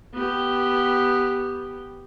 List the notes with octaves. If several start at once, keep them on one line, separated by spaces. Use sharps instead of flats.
B3 G4